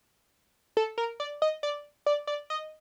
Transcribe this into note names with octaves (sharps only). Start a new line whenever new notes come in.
A4
A#4
D5
D#5
D5
D5
D5
D#5